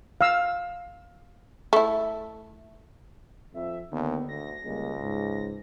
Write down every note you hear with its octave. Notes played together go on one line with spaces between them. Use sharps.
F5 E6
A3 E4
F2 E5
D#2 D3 B3
D2 A#6
C#2 G3 G#3 A#3
G#2